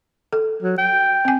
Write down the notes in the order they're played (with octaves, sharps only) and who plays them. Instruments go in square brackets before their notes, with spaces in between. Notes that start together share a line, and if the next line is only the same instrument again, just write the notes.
[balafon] A4
[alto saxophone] F#3
G5
[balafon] C4 G#5